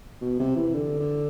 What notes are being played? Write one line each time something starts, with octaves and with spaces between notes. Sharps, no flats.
B2
C3
E3
D3
D3